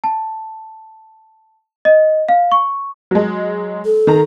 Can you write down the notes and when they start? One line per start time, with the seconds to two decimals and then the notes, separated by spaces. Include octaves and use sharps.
0.04 A5
1.85 D#5
2.29 F5
2.52 C#6
3.11 F#3 G#3
3.85 A4
4.07 D#3 A#5